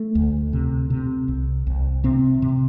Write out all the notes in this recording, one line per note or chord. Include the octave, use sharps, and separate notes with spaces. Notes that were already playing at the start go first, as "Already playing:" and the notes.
Already playing: A3
D2
C3
C3
C2
C2
C3 C4
C3